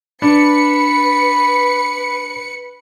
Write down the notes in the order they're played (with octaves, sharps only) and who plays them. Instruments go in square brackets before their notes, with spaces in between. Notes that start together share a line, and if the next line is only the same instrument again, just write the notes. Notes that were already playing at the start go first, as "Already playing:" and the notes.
[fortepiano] D4 [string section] B4 C#7 [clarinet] B5